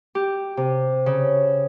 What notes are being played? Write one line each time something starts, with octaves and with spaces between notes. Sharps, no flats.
G4
C3
C#3